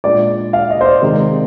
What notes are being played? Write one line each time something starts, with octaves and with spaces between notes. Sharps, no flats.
A#2 G#3 D4 D5
F5
D#5
C5
D5
C3 D#3 G#3